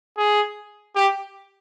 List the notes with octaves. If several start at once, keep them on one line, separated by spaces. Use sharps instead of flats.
G#4
G4